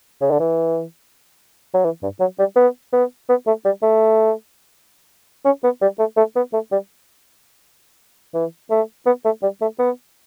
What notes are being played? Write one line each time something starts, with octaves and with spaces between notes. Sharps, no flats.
C#3
D3
E3
F#3
E3
G2
F#3
G3
B3
B3
B3
A3
G3
A3
C#4
B3
G3
A3
A3
B3
A3
G3
E3
A3
B3
A3
G3
A3
B3